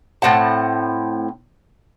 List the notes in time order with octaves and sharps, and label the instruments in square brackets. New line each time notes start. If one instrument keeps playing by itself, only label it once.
[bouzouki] A2 C4 F#5 A5